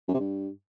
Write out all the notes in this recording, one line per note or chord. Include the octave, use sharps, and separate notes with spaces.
F#2
C3
G2